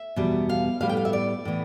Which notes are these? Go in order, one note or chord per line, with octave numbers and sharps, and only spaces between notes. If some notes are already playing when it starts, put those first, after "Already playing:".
Already playing: E5
E2 B2 G3 B3
F5
A2 G3 B3 F5
G5
F5
E5
D5
A2 E3 B3